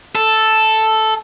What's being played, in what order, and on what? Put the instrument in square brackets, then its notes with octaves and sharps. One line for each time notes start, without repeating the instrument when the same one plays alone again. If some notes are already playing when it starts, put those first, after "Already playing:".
[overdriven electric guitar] A4